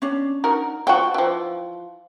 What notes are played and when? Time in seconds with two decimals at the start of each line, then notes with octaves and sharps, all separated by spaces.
0.02 C#4 D4
0.44 D#4 F#4 A#4
0.87 F3 F#4 G5
1.14 E3 F3